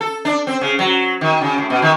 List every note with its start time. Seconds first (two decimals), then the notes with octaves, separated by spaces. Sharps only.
0.01 A4
0.25 D4
0.47 C4
0.61 C#3
0.79 F#3
1.21 D#3
1.41 C#3
1.58 A2
1.70 B2
1.82 D#3